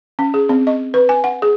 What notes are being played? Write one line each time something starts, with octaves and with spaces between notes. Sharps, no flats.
C#4
G#4
C4
D#5
B4
G#5
F#5
G#4